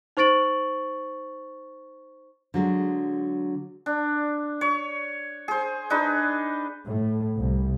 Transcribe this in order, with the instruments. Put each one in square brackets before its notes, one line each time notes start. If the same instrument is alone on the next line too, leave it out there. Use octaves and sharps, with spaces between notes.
[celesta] D#4 C5 C#6 A6 D7 F#7
[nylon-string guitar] D3 F#3 G#3
[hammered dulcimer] D4
C#5
G#4 C5
D4 D#4 G#4 B4
[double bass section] A2
C2